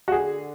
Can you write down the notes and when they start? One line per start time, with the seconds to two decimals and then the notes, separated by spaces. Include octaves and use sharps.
0.08 F#4
0.12 D3 G#4